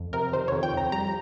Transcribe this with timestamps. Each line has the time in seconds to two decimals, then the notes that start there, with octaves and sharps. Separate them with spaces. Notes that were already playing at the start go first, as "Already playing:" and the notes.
Already playing: F2
0.13 C3 A#4
0.33 D#3 C5
0.48 F2 C#5
0.63 G5
0.73 F2 A#5
0.92 G3 A#5